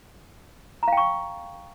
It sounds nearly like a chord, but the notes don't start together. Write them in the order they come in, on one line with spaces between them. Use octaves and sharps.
A#5 F5 G5 C#6